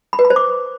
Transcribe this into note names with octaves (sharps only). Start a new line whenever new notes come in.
B5
B4
B5
C5
D6